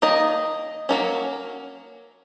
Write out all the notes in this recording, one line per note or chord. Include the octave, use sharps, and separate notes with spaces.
D#3 A#3 D#4 D#5
F#3 A#3 C#4